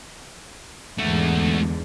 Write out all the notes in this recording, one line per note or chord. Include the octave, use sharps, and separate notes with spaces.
E2 G#2 D3 A3 F#4